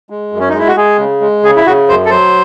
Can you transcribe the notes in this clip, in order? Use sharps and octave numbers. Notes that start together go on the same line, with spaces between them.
G#3
F#2
C#4
D#4
G#3
E4
F#4
G#3 G#4
C#3
G#3
C#3 G#4
E4
C#3 F#4
F#2 C5
A4
F#3 C5